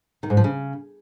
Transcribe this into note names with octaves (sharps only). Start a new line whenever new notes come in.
D#3
G#2
F3
C#3